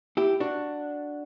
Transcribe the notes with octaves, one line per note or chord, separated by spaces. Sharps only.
E4 G4
D4 F#4